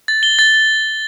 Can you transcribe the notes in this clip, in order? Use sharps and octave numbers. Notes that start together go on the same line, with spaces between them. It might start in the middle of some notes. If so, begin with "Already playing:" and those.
A6
G7
A6
A6